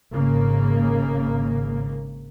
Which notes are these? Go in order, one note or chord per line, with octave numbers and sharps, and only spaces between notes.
G#1 C#3 A#3